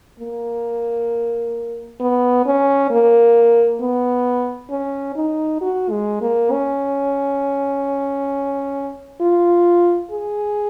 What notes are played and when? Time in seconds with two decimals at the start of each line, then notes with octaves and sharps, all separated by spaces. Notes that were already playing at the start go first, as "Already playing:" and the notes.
0.20 A#3
2.00 B3
2.46 C#4
2.91 A#3
3.81 B3
4.70 C#4
5.16 D#4
5.61 F#4
5.90 G#3
6.21 A#3
6.52 C#4
9.21 F4
10.11 G#4